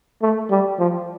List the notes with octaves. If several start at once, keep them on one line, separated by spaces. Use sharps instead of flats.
A3
G3
F3